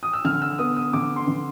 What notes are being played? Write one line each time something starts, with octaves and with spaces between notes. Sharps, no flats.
D#6
E6
D3 F6
E6
B3 D#6
D#6
D3 D6
C6
D3